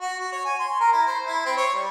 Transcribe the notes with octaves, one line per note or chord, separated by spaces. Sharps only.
F#4
F#4
C#5
G#5
C6
A#4
E4
C5
E4
C4
C#5
G3